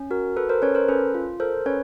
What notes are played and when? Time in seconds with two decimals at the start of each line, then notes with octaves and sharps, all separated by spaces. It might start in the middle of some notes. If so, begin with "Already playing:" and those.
Already playing: C#4
0.11 F#4 A#4
0.37 A4 B4
0.49 A#4 C5
0.62 C#4 B4 C#5
0.75 A#4 C5
0.88 C#4 A4 B4
1.14 F4
1.40 A4 A#4 C5
1.66 C#4 B4 C#5